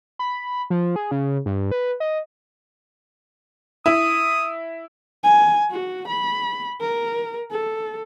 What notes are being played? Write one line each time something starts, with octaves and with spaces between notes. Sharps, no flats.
B5
F3
G#4
C#3
G2
B4
D#5
E4 D#6
G#5
F#4
B5
A#4
A4